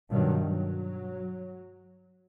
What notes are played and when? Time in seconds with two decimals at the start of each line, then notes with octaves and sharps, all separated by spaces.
0.10 G2 B2 D#3 F#3
0.42 F#3